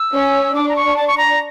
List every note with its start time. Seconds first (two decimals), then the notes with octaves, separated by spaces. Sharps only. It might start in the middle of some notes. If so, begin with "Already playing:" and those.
Already playing: E6
0.14 C#4
0.55 D4 D6
0.69 A#5
0.76 C#6
0.97 A5
1.08 C#6
1.18 A#5